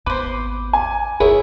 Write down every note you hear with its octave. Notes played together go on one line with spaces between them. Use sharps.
G#1 D#2 B3 B4 C5 D6
G#5
G1 D#2 G#3 B3 E4 G#4 A#4 C#5